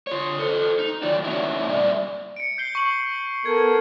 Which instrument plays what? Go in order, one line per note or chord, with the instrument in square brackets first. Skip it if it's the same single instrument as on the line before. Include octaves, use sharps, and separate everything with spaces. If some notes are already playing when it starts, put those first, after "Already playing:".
[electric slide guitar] F4 C#5
A4 C5
D#4
D#3 F#3 F4 D5
B3 C#4 D#4 E4
A#2 G3 D5 E5
[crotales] C#7 D7
G6 C7 G7
C#6 F#7
[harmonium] B3 A4 A#4 [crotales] G#6